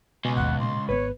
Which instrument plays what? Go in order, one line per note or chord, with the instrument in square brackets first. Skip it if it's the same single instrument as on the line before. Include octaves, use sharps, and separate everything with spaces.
[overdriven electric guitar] C#2 [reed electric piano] B2 [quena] G#5
[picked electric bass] G#1 D#2 [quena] F#5
[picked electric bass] A#2 G#3 [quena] C6
[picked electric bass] G#1 B3 [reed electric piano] B4 [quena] C#5